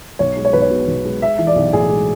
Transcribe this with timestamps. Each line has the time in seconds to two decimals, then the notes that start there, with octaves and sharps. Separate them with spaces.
0.19 B1 C#5
0.36 G#3
0.45 C#5
0.53 B1 B4
0.62 C#5
0.70 B2
0.88 B1
1.04 G#3
1.22 G#3 E5
1.38 E3 E5
1.47 D5
1.56 B1
1.73 A2 G#4
1.90 G#3